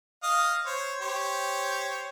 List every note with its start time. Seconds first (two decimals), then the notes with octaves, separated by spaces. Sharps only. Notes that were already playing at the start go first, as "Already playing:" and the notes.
0.23 D#5 F5 D#6
0.66 C5 C#5
1.01 G4 C5 C#5